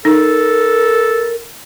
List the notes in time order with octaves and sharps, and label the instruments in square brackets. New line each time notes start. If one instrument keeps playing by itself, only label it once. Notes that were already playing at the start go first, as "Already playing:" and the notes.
[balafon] D#4 [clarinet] A4 [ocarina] A#4